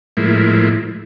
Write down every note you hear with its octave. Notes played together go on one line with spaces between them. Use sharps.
A2 F3 G#3 A#3 E4